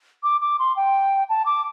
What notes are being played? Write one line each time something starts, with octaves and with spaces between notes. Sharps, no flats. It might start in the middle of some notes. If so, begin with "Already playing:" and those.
D6
D6
C6
G5
A5
D6